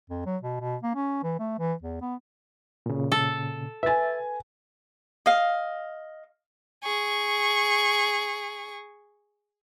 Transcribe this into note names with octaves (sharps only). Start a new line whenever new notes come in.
F2
F#3
B2
B2
A#3
C#4
E3
A3
E3
E2
B3
A#2 C#3
A4
B4 E5 G#5 A6
D#5 F5
G#4 C#6